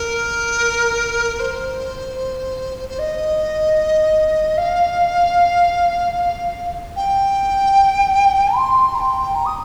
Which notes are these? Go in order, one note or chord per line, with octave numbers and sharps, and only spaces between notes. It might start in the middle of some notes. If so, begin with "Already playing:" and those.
Already playing: A#4
C5
C5
D#5
F5
G5
C6
A#5
G5
A#5
D#6